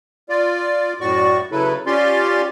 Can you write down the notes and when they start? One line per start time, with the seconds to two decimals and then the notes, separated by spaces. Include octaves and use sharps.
0.29 F4 D5
1.01 F#2 A2 F#4 D5 C#6
1.51 C#3 F#3 E4 A4 B4
1.86 C#4 F4 G4 D5 C6